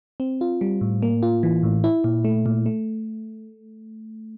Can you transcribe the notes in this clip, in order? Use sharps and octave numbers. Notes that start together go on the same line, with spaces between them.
C4
F4
G3
A2
A#3
F4
E3
A2
E4
A#2
A3
A#2
A3